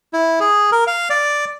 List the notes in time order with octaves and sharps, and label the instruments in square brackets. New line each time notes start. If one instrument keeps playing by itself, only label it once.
[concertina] E4
G#4
A#4
F5
D5